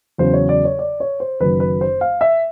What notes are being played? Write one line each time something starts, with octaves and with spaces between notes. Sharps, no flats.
E2 C#3 F#3 C5
C#5
D5
C#5
D5
C#5
C5
F#1 F#2 D#3 F#3 B4
B4
C5
F5
E5